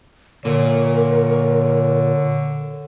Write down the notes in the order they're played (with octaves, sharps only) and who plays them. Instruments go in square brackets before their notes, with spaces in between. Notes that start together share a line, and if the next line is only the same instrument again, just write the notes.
[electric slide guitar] A#2 [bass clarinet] D3 [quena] A#4 [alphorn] C#5